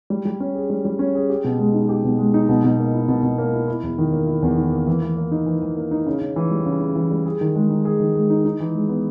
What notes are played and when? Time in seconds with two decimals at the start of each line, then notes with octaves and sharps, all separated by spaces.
0.10 G3
0.25 G3
0.40 C#4
0.55 G#4
0.70 G3
0.85 G3
0.99 C#4
1.15 G#4
1.30 G4
1.44 B2
1.59 G#3
1.74 D#4
1.89 G4
2.04 B2
2.18 G#3
2.34 D#4
2.49 B2
2.64 B2
2.78 A#3
2.93 E4
3.08 B2
3.23 B2
3.38 A#3
3.53 E4
3.68 E4
3.83 E2
3.98 D#3
4.13 A#3
4.27 E4
4.42 E2
4.57 D#3
4.72 A#3
4.87 E3
5.02 E3
5.17 A#3
5.32 D#4
5.47 E3
5.62 E3
5.77 A#3
5.91 D#4
6.06 C#3
6.21 C#3
6.36 E3
6.51 G3
6.66 C#3
6.81 C#3
6.96 E3
7.11 G3
7.26 G#4
7.41 D#3
7.56 G#3
7.70 D#4
7.85 G#4
8.00 D#3
8.15 G#3
8.30 D#4
8.45 D#4
8.60 E3
8.75 G#3
8.89 B3